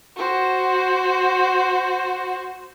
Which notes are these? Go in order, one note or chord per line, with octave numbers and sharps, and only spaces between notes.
F#4 C5